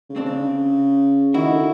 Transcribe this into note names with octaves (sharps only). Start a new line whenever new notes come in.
C#3
C4 D4
C#3
D#3 E4 F#4
D3